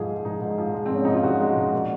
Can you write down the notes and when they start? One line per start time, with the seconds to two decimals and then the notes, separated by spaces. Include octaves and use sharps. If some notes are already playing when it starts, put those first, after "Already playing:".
Already playing: G#2 F3 G#4
0.08 G#3
0.25 G#2 D#4
0.41 G#2
0.58 F3
0.74 G#3
0.86 C4
0.90 G#2 C#4
1.05 G#2 D#4
1.14 F4
1.24 F3 F#4
1.40 G#3
1.56 G#2
1.72 A#2